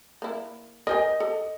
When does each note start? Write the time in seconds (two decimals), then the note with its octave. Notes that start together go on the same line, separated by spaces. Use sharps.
0.22 A#3 E4
0.87 A#4 C5 D#5 G#5
1.20 A4